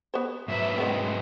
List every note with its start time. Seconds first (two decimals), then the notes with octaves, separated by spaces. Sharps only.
0.14 B3 C5
0.48 G#2 F#3 B4 E5
0.78 D#3 G#3 B3 C4